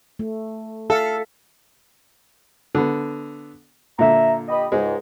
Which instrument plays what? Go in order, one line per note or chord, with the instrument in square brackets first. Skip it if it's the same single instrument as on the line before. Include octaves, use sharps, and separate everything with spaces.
[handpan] A3
[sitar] A4 [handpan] E5 F5
[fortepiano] D3 B3
[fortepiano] A#2 D3 [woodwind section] E5 A#5
[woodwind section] G4 D#5 B5
[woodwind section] C#2 G#2 [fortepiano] G#3